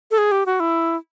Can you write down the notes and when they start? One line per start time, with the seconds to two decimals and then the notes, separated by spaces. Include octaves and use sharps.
0.11 A4
0.18 G#4
0.32 G4
0.46 F#4
0.60 E4